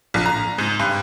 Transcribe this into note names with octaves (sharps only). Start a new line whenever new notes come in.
A#1
A#5
G#2
G2